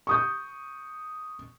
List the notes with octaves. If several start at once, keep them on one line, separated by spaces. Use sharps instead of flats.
C#6 D#6 G6